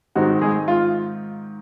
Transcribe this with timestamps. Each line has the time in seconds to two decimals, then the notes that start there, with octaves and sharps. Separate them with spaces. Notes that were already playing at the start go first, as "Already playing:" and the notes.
0.15 G#2 D#3 G#3 C4 F#4
0.42 G#3 G#4
0.68 F4